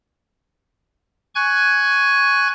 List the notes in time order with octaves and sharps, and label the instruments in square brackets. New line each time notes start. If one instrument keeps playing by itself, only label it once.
[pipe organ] G#5 C#6 F#6 G#6